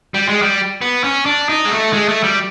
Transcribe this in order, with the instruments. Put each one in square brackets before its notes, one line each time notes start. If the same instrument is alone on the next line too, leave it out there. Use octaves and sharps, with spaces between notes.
[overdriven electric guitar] G3
G#3
G3
B3
C#4
D4
D#4
G#3
A3
G#3
A3
G3